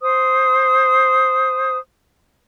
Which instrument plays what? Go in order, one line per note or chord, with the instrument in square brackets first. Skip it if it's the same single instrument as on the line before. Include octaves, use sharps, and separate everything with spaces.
[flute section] C5 D#6